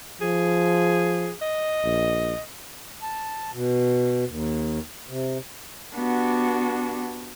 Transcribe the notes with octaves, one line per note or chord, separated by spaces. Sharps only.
F3 G#4
D#5
A#1
A5
B2
D#2
C3
B3 D4 F#4 G4